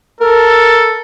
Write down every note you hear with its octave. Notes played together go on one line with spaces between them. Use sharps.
A4 A#4